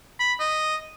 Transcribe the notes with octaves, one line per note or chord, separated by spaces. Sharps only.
B5
D#5